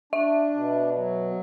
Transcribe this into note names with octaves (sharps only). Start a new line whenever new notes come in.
D4 E5
B2
F#3